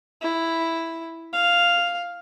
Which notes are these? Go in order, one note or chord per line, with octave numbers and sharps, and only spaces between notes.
E4
F5